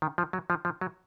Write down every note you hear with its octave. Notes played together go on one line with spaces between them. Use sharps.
D#3
F3
F#3
F3
F3
F#3